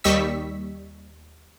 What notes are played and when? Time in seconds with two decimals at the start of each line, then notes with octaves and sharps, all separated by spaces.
0.04 D#2 G3 D#5 C#6 E6 B6